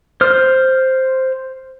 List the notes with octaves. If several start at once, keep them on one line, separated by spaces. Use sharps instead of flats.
C5 F6